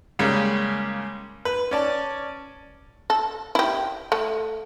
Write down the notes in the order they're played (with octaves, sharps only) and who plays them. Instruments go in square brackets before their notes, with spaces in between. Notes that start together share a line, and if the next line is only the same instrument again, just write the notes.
[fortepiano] C#3 G3 G#3 A#3 C#4
B4
C#4 D5 A5
[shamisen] A4
E4 G4
A3